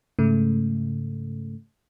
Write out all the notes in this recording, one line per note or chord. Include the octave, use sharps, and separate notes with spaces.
G#2 C#3 A3